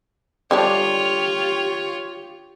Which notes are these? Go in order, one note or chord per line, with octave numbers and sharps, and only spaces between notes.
D3 G3 D4 F4 G4 C#5